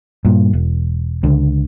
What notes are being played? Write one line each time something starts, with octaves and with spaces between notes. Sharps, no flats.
G2 A#2
E1
C#2 D3